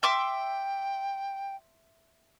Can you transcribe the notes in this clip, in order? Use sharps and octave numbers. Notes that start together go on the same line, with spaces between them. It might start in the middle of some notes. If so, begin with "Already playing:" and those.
E5 G5 C6 D6